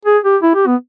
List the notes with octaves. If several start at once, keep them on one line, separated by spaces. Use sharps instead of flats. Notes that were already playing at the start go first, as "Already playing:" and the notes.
G#4
G4
E4
G4
B3